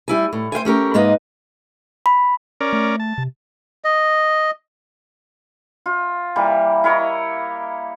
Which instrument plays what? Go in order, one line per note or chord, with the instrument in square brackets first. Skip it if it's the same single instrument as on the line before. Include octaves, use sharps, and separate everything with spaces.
[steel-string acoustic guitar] G3 E4 G#5
A2
C5 F5 G5 G#5
A3 C#4 G4 A#4
G#2 G#3 A#3 B4 D#5
[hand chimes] B5
[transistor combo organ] C#4 A#4 D5
[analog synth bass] A3
[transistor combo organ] A5
[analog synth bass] C3
[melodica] D#5
[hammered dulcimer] F4
E3 G3 A#3
E4 A#4 C#5 D#5